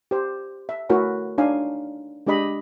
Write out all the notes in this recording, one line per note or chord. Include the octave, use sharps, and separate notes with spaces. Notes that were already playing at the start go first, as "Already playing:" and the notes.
G4 C5
E5
A3 E4 F#4 A#4 C#5 G#5
D4 D#4 C#5 F5 G#5
G#3 D4 G4 D#5 B5